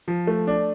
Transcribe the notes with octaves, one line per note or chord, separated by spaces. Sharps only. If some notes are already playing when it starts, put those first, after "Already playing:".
F3
A3
D4